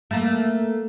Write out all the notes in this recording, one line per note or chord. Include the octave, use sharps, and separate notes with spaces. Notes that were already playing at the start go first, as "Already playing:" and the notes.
A3 A#3